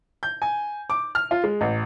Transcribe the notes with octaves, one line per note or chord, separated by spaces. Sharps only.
G6
G#5
D6
F6
F4
G#3
A1